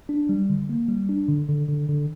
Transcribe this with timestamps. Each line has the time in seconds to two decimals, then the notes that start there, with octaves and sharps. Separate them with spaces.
0.09 D4
0.29 G3
0.49 D3
0.69 A#3
0.89 G3
1.09 D4
1.29 D3
1.49 D3
1.68 D3
1.89 D3